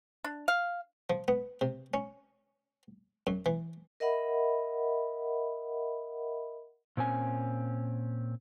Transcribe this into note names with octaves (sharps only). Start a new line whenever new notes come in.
D4
F5
F3
B3
C3
C#4
F#2
E3
A#4 D#5 E5 F#5 B5
A#2 C4 C#4 G#5